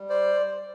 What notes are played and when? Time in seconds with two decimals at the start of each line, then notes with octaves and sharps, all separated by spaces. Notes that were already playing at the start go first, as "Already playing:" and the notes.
Already playing: G3
0.09 C5 D5